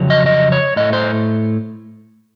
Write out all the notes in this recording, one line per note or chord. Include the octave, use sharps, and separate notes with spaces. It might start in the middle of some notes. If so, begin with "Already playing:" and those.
Already playing: F2 C#3 F#3
D#5
D#5
C#5
A2 A3 D#5
C5